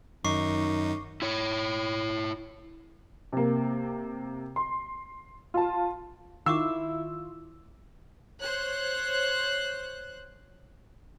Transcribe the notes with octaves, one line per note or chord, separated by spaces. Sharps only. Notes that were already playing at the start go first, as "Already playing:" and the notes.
F#2 D#3 D#4 C#6 D6 C7
E4 C#5
C3 A#3
C6
F4 A5
D#3 E4 F4 F5 C#6 D6 E6
C5 C#5 F#6